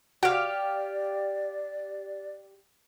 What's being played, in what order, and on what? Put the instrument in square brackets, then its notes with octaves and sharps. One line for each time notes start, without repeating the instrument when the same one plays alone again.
[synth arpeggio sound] F#4 [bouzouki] G4 F5 [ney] D5